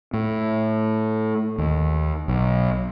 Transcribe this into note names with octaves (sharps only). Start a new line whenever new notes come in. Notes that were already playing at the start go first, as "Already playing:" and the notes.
A2
D#2
B1